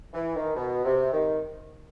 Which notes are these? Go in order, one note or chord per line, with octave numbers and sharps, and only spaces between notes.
E3
D#3
B2
C3
D#3